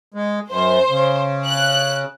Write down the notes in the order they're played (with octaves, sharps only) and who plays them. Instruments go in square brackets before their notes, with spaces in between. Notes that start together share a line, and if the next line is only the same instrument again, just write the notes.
[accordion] G#3
[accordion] F#2 [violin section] C5
[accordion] C#3
[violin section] F#6